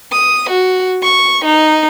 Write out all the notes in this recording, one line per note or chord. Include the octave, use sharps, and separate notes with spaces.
D#6
F#4
C#6
D#4